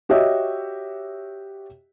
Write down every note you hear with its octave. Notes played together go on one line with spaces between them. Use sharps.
F#4 G4 C#5 D#5 E5